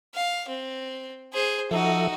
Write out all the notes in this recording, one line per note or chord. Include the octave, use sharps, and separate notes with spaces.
F5
C4
G#4 C5
F3 D#4 F#4 A4 E5